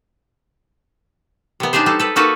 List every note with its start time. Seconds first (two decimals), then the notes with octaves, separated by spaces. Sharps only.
1.60 C3 B3
1.73 D4 D#4 G4 G#4 C5
1.86 G3 D#4 A4
1.99 A4 B4
2.16 A#3 D#4 F#4 A4 B4